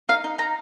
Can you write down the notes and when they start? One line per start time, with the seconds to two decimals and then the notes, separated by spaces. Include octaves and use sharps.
0.09 D#4 F5
0.24 D#4
0.38 D#4 A#5